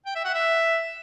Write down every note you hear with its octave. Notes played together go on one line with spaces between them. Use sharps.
G5
E5
F#5
E5